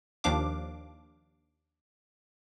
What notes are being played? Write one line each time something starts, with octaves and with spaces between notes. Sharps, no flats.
D#2 D#3 F3 D4 F5 D6